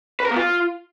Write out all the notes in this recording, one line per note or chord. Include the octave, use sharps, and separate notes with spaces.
B4
A#4
B3
F4